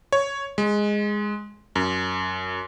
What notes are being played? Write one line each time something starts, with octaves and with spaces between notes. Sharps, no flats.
C#5
G#3
F#2